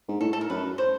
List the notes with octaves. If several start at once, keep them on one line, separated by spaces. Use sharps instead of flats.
G#2
A2 A4
A4
A#4
F#2 B4
C5